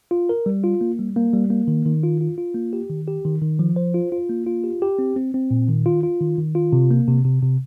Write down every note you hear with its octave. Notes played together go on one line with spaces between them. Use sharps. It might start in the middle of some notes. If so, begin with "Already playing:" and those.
F4
A#4
G3
F4
A#3
G3
A#3
G3
A#3
D#3
D#3
F4
F4
F4
A#3
G4
D#3
G4
D#3
D#3
F3
C5
F4
F4
A#3
F4
G4
G4
C4
C4
C4
A#2
D#3
F4
F4
D#3
D#3
F4
C3
A#3
C3
C3
C3